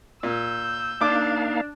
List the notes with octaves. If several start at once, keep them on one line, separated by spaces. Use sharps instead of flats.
A#2 E6 G6
A#3 D4 D#4 F5 D6